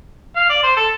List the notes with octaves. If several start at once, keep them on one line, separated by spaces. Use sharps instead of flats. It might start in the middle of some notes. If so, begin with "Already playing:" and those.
F5
D5
C5
A4